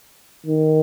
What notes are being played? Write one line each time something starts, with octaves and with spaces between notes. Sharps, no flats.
D#3